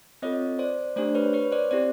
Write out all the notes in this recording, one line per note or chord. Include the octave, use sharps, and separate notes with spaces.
C4 F4 A4 C#5 D#5
C5 D5
A3 D4 G4 C5 D5
B4 C#5
B4 C#5
C5 D5
C4 E4 G4 C5 D5